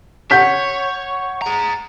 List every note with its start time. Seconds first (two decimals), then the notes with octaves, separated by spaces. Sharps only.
0.31 C#5 F#5 G6 B6
1.42 G#4 A#5